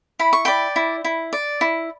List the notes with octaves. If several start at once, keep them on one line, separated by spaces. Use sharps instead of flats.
E4 B5
C#6
D5 G5 B5
E4
E4
D5
E4